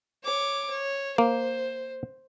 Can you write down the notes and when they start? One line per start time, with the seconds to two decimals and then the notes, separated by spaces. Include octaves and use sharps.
0.24 C#5 D6
0.70 C#5
1.18 A#3 C5